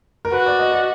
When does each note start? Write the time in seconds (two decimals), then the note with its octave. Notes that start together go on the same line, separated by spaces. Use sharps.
0.25 A#4
0.32 F#4 B4
0.46 D5
0.59 D#5
0.72 D5